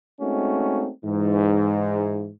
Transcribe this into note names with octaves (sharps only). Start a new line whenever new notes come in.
G#3 A3 C4 C#4 D#4 F#4
G#2 E3